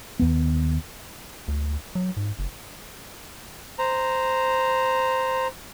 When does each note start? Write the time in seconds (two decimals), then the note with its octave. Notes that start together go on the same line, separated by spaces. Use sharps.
0.20 D#2 B3
1.48 D2
1.95 F#3
2.17 G#2
2.39 F#1
3.79 C5 A#5